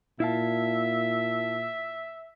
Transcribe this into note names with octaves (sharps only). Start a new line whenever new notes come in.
A#2 E4 E5 F5 A5